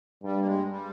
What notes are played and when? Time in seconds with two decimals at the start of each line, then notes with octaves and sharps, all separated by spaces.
0.23 G2 G3
0.41 A#3
0.46 G#3
0.71 G3